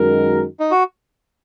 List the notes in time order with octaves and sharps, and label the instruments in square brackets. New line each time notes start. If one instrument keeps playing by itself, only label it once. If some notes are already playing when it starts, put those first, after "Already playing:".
Already playing: [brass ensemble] F#2 D#3 G#3 F#4 A#4
[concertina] D#4
F#4